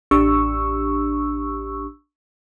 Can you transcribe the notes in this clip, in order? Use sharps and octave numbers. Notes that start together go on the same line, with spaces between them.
A1 D4 G4 C#6 E6